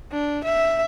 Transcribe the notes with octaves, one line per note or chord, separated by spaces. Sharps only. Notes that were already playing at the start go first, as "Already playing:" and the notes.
D4
E5